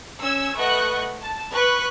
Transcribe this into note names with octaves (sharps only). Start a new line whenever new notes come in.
C#4 E6 G#6
A3 B4 D#5 F#5 C#6 F#6
A5
B4 C#6 F#6